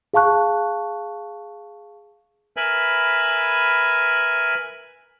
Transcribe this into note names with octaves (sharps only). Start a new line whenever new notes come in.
G#4 F5 A5 C#6 F#6
A#4 B4 E5 G#5 B5